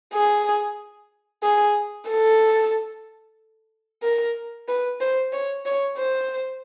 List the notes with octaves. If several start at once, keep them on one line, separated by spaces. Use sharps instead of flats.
G#4
G#4
A4
A#4
B4
C5
C#5
C#5
C5